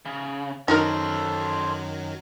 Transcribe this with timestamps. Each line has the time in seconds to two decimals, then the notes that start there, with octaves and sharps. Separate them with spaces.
0.06 C#3
0.68 F#2 D#3 F#3 D#4 F#4 A4 A#4 C5